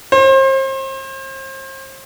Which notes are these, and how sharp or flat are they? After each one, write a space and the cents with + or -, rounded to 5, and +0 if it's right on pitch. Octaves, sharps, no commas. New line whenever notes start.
C5 +35